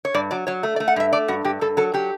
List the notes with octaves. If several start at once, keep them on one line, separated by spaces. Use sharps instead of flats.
C#5
G2 D5
F#3 D5
F#3 C#5
A3
D5
A3
F#5
G2 E5
A3 D5
G2 F#4
G2 G4
G2 A4
F#3 A4
F#3 G4